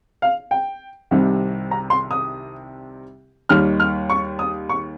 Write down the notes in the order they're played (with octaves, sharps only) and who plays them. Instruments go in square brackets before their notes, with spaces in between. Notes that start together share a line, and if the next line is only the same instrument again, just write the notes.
[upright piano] F5
G5
C2 C3 D#3 G3
A#5
C6
D#6
D#2 D#3 G3 F6
F6
C#6
D#6
C#6